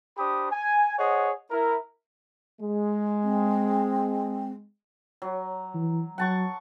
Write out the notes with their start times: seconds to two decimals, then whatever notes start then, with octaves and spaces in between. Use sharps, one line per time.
0.18 D4 G4 C5 B5 D#6
0.52 G#5
0.99 G#4 C5 C#5 D#5 F#5
1.51 E4 A#4
2.61 G#3
3.24 C4
5.22 F#3
5.75 E3
6.18 F#3 F#5 A5 C#6